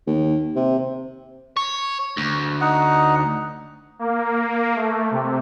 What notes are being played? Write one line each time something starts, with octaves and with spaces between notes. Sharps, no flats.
D#2
C3
C#5
D2
D#4 F#5
A#3
A3
C3